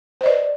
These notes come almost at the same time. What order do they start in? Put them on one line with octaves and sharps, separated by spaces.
C5 D#5 D5 B4